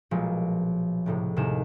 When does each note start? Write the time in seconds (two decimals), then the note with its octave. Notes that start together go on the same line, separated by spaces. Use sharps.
0.11 B1 A#2 F3 G#3
1.06 C#2 A2 C3
1.36 D#2 A2 C3 G#4 E7